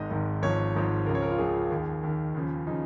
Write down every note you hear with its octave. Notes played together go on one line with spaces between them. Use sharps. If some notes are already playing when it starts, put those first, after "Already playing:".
Already playing: G#1 G#2 D#3 D#5
G#1 G#2 D#3
G#1 G#2 F3 C#5
G#1 G#2 F3
C#2 C#3 F3 A#4
C#5
A#4
F4
C#2 C#3 F3 G#4
D#2 D#3
D#2 D#3
D#2 C#3 F3
C#3 F3 D#4